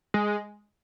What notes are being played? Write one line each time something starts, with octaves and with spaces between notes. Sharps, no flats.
G#3